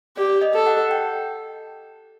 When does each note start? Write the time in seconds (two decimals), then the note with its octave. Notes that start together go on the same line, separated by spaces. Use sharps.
0.17 G4 D5
0.41 D#5
0.54 A4
0.67 F#5
0.91 G5